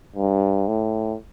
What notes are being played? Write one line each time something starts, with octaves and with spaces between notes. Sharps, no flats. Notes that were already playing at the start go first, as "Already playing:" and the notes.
G2
A2